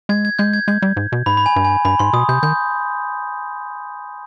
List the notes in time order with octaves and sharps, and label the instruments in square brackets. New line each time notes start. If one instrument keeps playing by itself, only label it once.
[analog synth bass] G#3 [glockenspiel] G#6
[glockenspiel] G#6
[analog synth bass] G#3 [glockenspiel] G6
[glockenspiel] G#6
[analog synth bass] G#3 [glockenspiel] G6
[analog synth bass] G3
G#2
B2
[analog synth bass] G#2 [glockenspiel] B5
[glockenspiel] B5
G#5
[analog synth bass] G2
[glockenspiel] G#5
[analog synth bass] G2 [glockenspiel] B5
[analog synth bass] G#2 [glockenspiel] C6
[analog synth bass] B2 [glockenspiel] D#6
[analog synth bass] C3 [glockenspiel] G6
[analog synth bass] D#3 [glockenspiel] G6